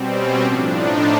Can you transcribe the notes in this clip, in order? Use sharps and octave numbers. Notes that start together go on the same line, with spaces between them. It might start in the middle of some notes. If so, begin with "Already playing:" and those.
Already playing: B2 G3 C4
C#4
A2 F3 D4
D#4